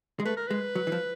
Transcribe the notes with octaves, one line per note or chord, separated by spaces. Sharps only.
G#3
A3 B4
A#4
G#3 B4
F#3
E3
F3